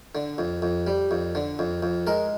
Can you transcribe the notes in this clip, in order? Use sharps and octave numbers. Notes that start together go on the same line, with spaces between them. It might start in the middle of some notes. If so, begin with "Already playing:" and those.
D3
F2
F2
G3
F2
D3
F2
F2
G#3 A#4